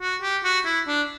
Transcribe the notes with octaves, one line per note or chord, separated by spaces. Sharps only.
F#4
G4
F#4
E4
D4